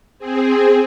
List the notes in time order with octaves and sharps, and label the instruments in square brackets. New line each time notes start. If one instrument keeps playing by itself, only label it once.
[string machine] C4 G#4